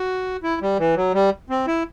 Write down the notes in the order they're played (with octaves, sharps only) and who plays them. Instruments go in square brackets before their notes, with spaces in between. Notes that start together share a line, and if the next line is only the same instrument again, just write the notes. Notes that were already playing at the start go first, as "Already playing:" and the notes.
Already playing: [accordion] F#4
E4
G3
E3
F#3
G3
C4
E4